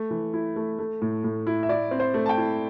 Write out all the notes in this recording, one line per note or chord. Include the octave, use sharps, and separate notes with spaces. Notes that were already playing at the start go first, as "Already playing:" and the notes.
Already playing: A3
E3
E4
A3
A3
A2
A2
E4
E5
E4 D5
C4
C5
A3
A5
G5
E4